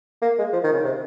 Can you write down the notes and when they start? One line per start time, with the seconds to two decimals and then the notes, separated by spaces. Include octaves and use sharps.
0.22 A#3
0.38 G#3
0.53 F3
0.64 D#3
0.73 C#3
0.84 C3